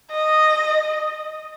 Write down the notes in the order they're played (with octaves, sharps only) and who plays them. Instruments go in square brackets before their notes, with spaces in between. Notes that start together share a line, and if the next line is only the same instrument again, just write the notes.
[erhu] D#5